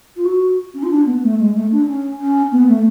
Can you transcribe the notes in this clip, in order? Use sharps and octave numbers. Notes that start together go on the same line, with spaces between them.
F4
F#4
C#4
F4
D4
B3
A3
G#3
A3
D4
C#4
C#4
B3
A3